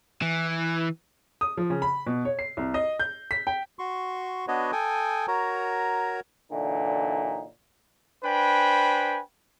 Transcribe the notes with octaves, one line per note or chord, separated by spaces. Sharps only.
E3
D#6
F3
C#3
B5
B2
C#5
C7
C2
D#5
G6
B6
G5
F#4 C6 C#6
B3 D4 F#4 B4 C#5 D#5
A4 G5 G#5 D#6
F#4 A#4 C#5 A#5
A#2 D3 E3 F#3 D#4
D4 B4 C5 G5 G#5 B5